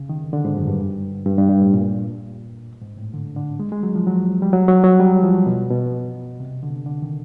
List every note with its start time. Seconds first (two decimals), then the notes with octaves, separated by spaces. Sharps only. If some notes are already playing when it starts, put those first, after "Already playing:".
Already playing: C#3
0.09 D#3
0.33 D3
0.45 G#2
0.57 F#2
0.67 G2
1.26 G2
1.39 G2
1.49 G2
1.61 A2
1.74 A#2
2.82 G#2
2.98 A2
3.14 D3
3.36 D3
3.59 G#3
3.72 G#3
3.83 F#3
3.95 F3
4.07 F#3
4.42 G3
4.53 F#3
4.68 F#3
4.84 F#3
5.00 G3
5.23 F3
5.46 B2
5.70 B2
6.40 C3
6.63 D3
6.86 D3
7.02 D#3